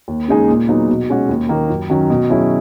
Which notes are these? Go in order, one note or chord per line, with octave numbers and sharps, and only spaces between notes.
D#2
C#3 G#3 D#4 G#4
A#2
F#3 B3 D#4 G#4
B2
G#3 C#4 F#4
D#2
D#3 A#3
F#2
D#3 F#3 C#4
B2
F#3 C#4 E4 G#4